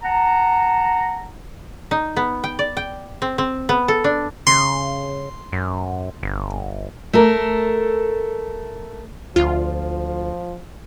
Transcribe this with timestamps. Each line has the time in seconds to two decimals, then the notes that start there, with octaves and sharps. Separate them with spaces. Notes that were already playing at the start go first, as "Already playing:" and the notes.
0.03 F#5 A5 A#5
1.91 D#4
2.17 B3
2.44 G5
2.59 D5
2.77 G5
3.22 C4
3.38 C4
3.69 B3
3.88 A4
4.04 D4
4.47 C#3 C6
5.52 F#2
6.23 G1
7.13 A3 A4 A#4
9.36 D2 F3 F4